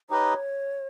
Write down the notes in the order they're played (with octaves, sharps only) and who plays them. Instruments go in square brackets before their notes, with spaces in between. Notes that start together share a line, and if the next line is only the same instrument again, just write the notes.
[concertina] D#4 G4 B4 D#5 [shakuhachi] C#5